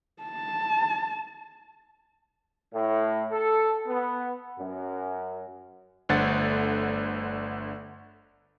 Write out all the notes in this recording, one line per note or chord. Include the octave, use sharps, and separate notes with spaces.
A5
A2
A4
B3
F#2
G1 D3 A3 C5 F#5 A6